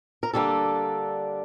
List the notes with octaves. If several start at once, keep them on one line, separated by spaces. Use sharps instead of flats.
A#4
D3 G3 A#3 D4 A4